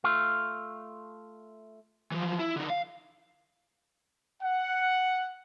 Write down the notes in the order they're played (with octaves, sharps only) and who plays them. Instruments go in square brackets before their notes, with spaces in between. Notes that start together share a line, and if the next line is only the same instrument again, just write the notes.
[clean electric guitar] A3 F4
[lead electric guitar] E3 F3
E4
D3 D#4
F5
[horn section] F#5